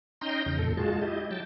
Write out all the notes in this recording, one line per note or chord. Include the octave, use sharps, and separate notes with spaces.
C#4 D#4 D#5 G5 A#5 C6
E2 C#3
F2 A#2 A4
G#3 F4 F#4 G#4 A5
E4 G4 D#5
F#3 G5 A5